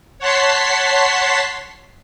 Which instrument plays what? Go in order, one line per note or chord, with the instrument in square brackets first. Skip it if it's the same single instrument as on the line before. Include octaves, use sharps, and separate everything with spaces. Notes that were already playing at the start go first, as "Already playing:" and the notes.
[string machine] C#5 F#5 A5 C6 B6 C7